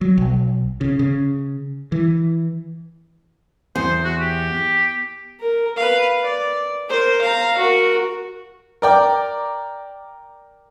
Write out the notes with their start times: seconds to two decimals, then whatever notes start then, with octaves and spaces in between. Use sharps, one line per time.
0.01 F#3
0.18 B1
0.81 C#3
0.99 C#3
1.92 E3
3.76 E2 C5
4.04 F#4
4.21 G4
5.40 A#4
5.77 B4 F5
6.23 D5
6.88 A#4 C5
7.22 F5 A#5
7.58 F#4 A#4
8.82 A#4 D5 G5